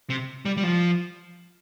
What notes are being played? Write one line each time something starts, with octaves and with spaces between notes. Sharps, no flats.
C3
G3
G3
F3